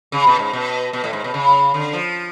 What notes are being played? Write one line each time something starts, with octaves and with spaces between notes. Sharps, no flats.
C#3
B2
G#2
B2
B2
A2
G#2
B2
C#3
D3
F3